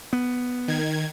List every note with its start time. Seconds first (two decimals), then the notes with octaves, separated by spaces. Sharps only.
0.13 B3
0.68 D#3 G#6